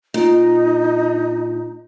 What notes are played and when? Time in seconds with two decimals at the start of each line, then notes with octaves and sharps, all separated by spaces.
0.14 A#2 D#4